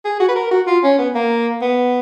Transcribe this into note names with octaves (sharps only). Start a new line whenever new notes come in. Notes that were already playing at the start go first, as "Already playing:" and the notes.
G#4
F#4
B4
A#4
F#4
F4
C#4
B3
A#3
B3